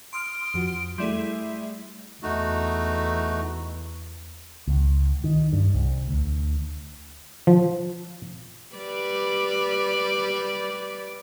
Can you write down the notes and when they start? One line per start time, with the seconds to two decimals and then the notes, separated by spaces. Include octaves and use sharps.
0.13 C6 D#6 F6 D7
0.54 F2 F3 F#4
0.98 G3 A3 E4 G#4 D5 E5 C6
2.23 E2 A3 D#4 F#4
4.68 C#2
5.24 D#3
5.53 G2
5.74 C2
6.08 D2
7.47 F3
8.74 G3 B4 D5